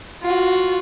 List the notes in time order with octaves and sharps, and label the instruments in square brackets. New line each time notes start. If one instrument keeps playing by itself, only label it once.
[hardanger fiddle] F4 F#4